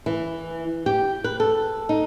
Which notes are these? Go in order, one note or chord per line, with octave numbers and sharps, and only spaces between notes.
E3
G4
B4
A4
D#4